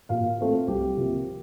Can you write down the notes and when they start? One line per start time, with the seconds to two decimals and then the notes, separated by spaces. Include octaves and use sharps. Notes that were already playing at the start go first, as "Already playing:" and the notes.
0.09 A#2 F5
0.39 A3 C4 F4
0.68 C2 G4
0.97 C3 F3 A#3